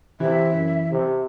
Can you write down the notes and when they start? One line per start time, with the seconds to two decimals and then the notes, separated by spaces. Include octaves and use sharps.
0.20 C3 E3 E5
0.53 F#2
0.90 C3